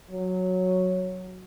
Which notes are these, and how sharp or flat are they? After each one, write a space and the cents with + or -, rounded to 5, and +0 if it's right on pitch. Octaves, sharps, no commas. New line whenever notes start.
F#3 -5